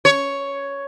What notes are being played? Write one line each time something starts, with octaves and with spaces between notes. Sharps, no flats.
C#5